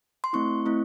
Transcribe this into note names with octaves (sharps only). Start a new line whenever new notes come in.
C6
A3 C4 E4 C#6
A3 C4 E4